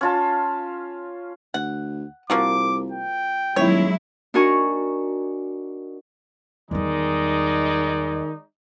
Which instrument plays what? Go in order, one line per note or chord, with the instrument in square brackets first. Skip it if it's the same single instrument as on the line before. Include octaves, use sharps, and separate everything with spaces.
[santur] C#4 F4 A5
[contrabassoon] D2 [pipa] F#5
[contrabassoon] C2 [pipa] F3 A#3 F#4 [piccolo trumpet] D6
[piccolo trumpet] G5
[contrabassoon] D#1 [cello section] F#3 G#3 E4 [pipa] C#5
[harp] D4 D#4 F#4 A#4 G#5 C#6
[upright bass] E2 G3 [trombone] D#3 [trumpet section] G#3 D#4 D5